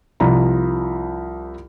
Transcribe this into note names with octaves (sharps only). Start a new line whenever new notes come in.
C2 F3 A#5 B5